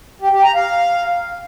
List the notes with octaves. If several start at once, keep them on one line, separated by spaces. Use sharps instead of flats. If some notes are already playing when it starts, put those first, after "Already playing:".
G4
G4
A#5
F5